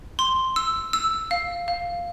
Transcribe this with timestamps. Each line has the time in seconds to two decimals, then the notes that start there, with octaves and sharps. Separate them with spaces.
0.19 C6
0.56 E6
0.93 E6
1.31 F5
1.68 F5